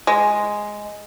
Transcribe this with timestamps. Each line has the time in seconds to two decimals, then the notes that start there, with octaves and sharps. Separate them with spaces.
0.07 G#3